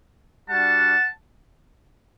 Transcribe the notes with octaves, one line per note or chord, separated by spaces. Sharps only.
G3 D4 F#4 F#5 A5